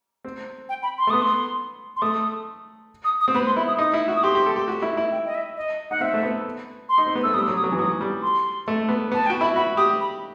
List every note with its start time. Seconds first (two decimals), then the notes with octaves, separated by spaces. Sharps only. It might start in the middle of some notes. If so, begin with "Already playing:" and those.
0.24 C4
0.69 G5
0.83 B5
0.98 C6
1.07 A3
1.10 B3 D#6
1.22 C6
1.96 C6
2.02 A3 D#6
3.05 D#6
3.21 D#6
3.28 C4
3.35 B3 B5
3.46 C6
3.56 E4 B5
3.68 D#6
3.79 D#4 D#6
3.94 E4
4.08 F#4
4.16 D#6
4.23 G4 C6
4.35 G4
4.46 A4
4.56 G4
4.68 F#4
4.82 E4
4.97 E4
5.12 G5
5.25 D#5
5.35 E5
5.57 D#5
5.90 D#4 F#5
6.01 C4 E5
6.14 A3
6.23 B3
6.89 C6
6.98 D#4
7.07 C4
7.15 B3
7.23 A3 E6
7.34 G3 D#6
7.48 F#3
7.56 D#6
7.64 F#3
7.72 E3
7.78 F#3 D#6
8.01 G3
8.22 C6
8.68 A3
8.89 B3
9.12 B3 A5
9.26 G5
9.30 F#4
9.41 E4 B5
9.56 F#4 B5
9.77 G4 D#6
10.00 B5